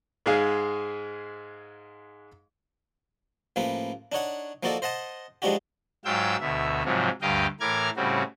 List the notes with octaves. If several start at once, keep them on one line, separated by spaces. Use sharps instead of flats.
G#2 G#3 G#4 F5
A1 F3 A#3 B4
D4 D#4 C#5 F#5
F3 A#3 D#4 F#4 A4 D5
C5 D#5 F#5 A5
F3 G#3 D4 D#4 F#4 G4
G#2 F#3 F4 G5 E6 G6
D2 B2 E5
G#2 C3 F3 F#3
D2 G2 G4 D#5 F5 G5
A2 E3 A#4 D6 F6 G#6
A2 C#3 G3 C4 F#4